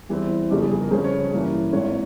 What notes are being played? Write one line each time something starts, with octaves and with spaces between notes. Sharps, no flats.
E2 E3 G3 C4
G1 F2 C#3 G3 G4
G#4
G#4
A#4
F2 C#3 G3 C#4 C5
C#5
C#5
G2 E3 A#3 C#4
G#1 G#2 E3 A#3 C#5